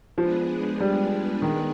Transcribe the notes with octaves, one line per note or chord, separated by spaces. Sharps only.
F3 G#3 B3 D4 G#4 B4
G3
D#3